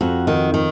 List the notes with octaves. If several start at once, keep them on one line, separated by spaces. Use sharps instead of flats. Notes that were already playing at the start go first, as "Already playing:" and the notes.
F2 F#4
D#3
D#3